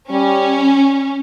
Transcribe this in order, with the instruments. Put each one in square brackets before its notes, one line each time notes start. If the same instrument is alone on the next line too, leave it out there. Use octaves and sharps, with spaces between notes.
[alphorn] G3 [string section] C#4